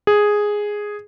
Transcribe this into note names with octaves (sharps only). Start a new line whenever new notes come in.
G#4